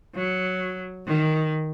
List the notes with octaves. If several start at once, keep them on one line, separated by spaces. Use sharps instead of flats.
F#3
D#3